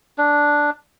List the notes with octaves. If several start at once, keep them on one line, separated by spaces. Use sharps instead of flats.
D4